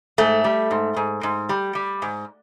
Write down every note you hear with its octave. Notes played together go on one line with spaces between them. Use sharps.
G#2 A3
G3
G#2
G#2
G#2
G3
G3
G#2